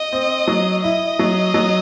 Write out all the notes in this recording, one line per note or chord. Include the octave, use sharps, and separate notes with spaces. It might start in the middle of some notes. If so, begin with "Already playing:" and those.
Already playing: D#5
C4
F#3
E4 D#5
F#3
F#3